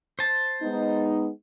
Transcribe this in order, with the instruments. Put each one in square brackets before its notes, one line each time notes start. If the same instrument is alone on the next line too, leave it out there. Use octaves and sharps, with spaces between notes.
[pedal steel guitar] C5 A5
[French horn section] G#3 B3 D#4